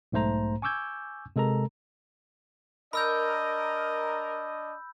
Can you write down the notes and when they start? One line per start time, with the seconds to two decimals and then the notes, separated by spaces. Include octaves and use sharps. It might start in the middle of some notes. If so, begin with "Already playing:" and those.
0.12 B1 G#2 A3 C5 A#5
0.62 G#5 C#6 D6 E6 G6 G#6
1.36 C3 G#3 A4 A#4 A#5
2.93 D4 A#4 D#5 B5 E6 G6